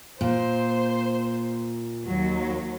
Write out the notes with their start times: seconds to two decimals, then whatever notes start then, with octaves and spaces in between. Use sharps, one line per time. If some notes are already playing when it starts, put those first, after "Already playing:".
0.21 A#2 C5
2.08 D#2 F#3